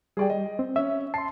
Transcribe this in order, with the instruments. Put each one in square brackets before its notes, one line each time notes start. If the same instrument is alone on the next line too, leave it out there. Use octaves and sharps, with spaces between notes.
[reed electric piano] G3 [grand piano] G#4 D5 G5
[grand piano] D#5
[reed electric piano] C4
[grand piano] C#4 [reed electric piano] E5
[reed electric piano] A5 C6 [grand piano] C7